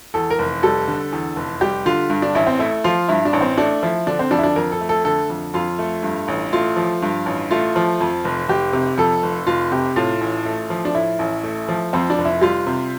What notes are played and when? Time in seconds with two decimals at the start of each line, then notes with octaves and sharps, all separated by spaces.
0.14 E2 A4
0.30 A#4
0.39 F1
0.63 G3 A4
0.88 D3
1.12 E2
1.36 F1
1.61 G3 G4
1.86 D3 F4
2.10 G2
2.22 D4
2.35 A1 E4
2.47 C4
2.59 A3 E4
2.84 F3 F4
3.08 G2 E4
3.25 D4
3.33 A1
3.41 C4
3.57 A3 D4
3.83 F3 E4
4.07 D3 D4
4.19 C4
4.31 F2 D4
4.39 E4
4.43 D4
4.56 F2 A#4
4.72 A4
4.81 A3
4.89 A4
5.05 D3 A4
5.30 F2
5.54 F2 F4
5.79 A3
6.03 G2
6.28 A1
6.53 A3 F4
6.76 F3
7.02 G2
7.26 A1
7.51 A3 F4
7.76 F3
8.00 F2
8.25 F1
8.48 F1 G4
8.73 C3
8.98 F2 A4
9.23 F1
9.47 F1 F4
9.72 C3 G4
9.96 A2 F4
10.21 A1
10.45 A3
10.70 F3
10.85 D4
10.94 A2 E4
11.19 A1
11.44 A3
11.69 F3
11.93 F2 C4
12.10 D4
12.18 F1
12.25 E4
12.41 G3 F4
12.67 C3